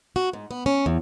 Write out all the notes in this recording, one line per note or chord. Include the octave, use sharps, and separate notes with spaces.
F#4
G#2
B3
C#4
E2